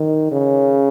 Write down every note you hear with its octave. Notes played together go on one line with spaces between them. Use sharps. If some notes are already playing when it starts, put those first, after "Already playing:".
Already playing: D#3
C#3